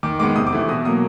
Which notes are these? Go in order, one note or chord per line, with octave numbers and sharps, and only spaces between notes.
D#3 D6
G#3 B3 D6
C3 D#6
D6
E3 A3
B2 D#6
F#3 A#3 D#6